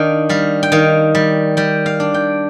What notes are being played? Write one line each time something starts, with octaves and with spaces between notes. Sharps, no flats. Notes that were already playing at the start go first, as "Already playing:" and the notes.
Already playing: D#3 D4 D#5 F5 G5
G3 F5
G5
D#3 F5
G3
G3 G5
F5
D4
G5